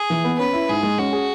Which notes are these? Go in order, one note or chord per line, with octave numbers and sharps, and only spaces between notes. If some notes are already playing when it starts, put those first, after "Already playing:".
Already playing: G#4
E3
B3
C#4 B4
E4
G#2 G#4
G#3
C#4 F#4
G#4